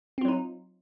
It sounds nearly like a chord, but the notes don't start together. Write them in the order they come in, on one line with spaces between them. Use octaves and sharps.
C4 F4 F#3 D#4